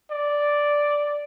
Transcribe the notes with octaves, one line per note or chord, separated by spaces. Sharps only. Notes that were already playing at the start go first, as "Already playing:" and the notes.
D5